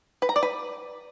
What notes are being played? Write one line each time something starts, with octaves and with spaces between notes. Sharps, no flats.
B4
A#5
D5
B4